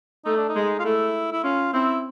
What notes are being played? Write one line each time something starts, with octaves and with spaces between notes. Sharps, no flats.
A3 D#4
D4
D#4
G#3
F4
A3 E4
E4
C#4 F4
C4 E4